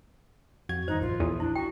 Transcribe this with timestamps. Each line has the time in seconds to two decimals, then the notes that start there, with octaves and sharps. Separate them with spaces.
0.69 F2 F#4 G#6
0.88 G2 D#3 D#4 C5
1.01 A#1 F4
1.20 E2 A4
1.40 D4 E4
1.55 F#4 G5